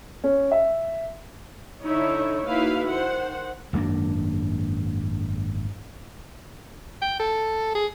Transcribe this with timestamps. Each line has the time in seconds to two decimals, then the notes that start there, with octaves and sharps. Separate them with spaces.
0.24 C#4
0.52 E5
1.81 D3 D#4 E4 C#5
2.46 A#3 D#4 E4 F#4 B4 F5
2.88 D#3 C5 F#5
3.73 G#1 F#2 A#3 D4
7.02 G5
7.20 A4
7.75 G#4